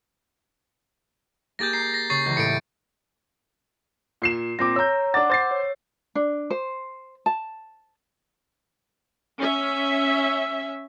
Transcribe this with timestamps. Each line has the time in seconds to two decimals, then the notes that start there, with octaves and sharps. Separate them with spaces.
1.59 A#3 G4 G#4 G6 A6 A#6
1.73 A#5 C7
1.94 A#6
2.10 C#3 C#6 A6 C7
2.26 C#2 E3
2.37 A2 C#7 D7
4.22 A#2 C7 E7
4.59 A#2 C4 D6 A#6
4.76 C#5 A#5 E6 G6
5.14 D4 F#5 D6 A6
5.30 C5 A6 C7
5.51 C#5
6.15 D4
6.50 C5
7.26 A5
9.39 C#4 E5